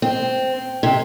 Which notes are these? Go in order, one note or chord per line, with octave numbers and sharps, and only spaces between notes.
C4
C3